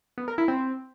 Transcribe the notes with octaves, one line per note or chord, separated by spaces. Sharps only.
B3
A#4
E4
C4